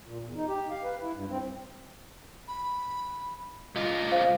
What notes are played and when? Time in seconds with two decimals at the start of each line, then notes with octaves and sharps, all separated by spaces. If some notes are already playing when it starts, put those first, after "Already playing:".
0.06 A#2
0.24 E2
0.36 D#4
0.48 G4
0.70 F5
0.84 B4
1.01 E4
1.14 G2
1.29 C4
2.48 B5
3.75 C2 F4 D#5
4.12 C5 F5